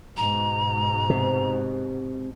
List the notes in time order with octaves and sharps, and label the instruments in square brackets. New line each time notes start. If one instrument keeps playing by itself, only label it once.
[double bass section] G#2 B2 [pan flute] A#5
[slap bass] C3